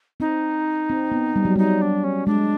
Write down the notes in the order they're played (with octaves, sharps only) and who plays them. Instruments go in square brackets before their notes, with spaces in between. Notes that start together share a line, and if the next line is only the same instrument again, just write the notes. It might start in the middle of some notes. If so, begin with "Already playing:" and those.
[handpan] C4 [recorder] D#4
[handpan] C4
B3
G3
F#3
[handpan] G3 [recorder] D#4
[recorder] D4
C#4
[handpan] G#3 [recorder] D4